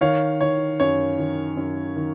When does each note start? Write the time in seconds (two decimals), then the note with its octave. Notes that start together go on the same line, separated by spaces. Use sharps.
0.01 D#3 C#5 F5
0.41 D#3 C#5
0.80 F#2 C#5
1.19 D#3
1.57 F#2
1.96 D#3